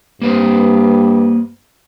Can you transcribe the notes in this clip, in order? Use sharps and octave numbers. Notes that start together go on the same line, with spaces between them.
G2 A#3 B4 C5